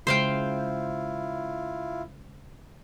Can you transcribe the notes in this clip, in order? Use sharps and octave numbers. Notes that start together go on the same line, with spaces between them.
C#3 G#3 E4 F4 C5 F5 G5